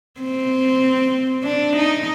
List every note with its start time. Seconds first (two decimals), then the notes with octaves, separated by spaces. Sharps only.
0.21 C4
1.44 D4
1.76 D#4